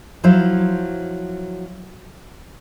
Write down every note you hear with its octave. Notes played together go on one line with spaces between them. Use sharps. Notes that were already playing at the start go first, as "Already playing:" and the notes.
F3 F#3 E4 C5